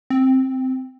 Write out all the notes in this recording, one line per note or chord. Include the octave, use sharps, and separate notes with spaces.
C4